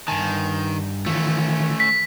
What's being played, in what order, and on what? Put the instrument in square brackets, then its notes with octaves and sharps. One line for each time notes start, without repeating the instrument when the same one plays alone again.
[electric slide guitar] G2 G#5 A5 [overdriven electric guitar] D#3
[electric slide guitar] D#3 E3 F4 [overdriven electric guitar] A3 C#4
[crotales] B6